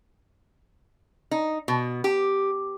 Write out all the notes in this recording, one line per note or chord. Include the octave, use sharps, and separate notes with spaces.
D#4
B2
G4